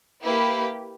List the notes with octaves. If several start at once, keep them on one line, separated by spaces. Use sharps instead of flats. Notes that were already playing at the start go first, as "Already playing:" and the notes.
A#3 E4 G4 B4